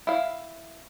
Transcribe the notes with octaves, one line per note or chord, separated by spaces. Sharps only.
E4 F5